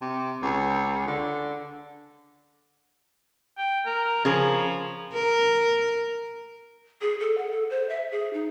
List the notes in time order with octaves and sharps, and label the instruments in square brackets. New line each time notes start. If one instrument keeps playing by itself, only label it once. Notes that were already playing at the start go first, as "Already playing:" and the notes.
[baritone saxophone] C3
C#2
D3
[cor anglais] G5
A#4
[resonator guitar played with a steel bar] C#3 G#4 A#4 [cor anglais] F3
[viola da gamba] A#4
[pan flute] G#4
A4
F#5
A4
C5
E5
G#4
D#4